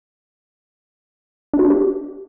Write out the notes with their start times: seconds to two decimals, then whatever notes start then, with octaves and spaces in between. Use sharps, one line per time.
1.53 D4
1.59 F#4
1.65 D4
1.70 G4